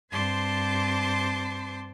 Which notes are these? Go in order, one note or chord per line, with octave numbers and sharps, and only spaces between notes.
G2 C4 C5 A5 C6 D6